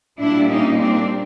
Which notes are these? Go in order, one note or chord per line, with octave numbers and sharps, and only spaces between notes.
A#2 G3 A#3 D4 E4
C#4 D#4
C4 D4